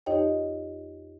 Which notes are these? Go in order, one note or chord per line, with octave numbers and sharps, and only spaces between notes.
F2 D#4 G4 C#5 D#5 G5